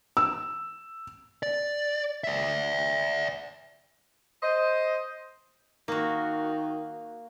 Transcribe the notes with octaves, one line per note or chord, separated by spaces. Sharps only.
E6
D5
D5 E5
C5 D#5
D#3 A#3 F#4